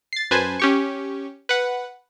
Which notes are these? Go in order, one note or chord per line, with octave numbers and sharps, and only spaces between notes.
A6 C7
F#2 B4 C5 G#5 A5
C#4 G4 C#6
B4 F#5